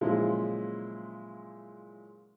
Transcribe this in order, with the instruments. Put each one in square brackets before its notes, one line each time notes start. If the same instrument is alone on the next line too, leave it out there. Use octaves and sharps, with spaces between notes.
[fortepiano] A#2 C#3 F3 F#3 G#3 E4